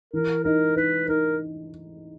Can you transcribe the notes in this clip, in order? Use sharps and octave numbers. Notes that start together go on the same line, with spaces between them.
E3 A#4
D#4 A#4
D#4 B4
D#4 A#4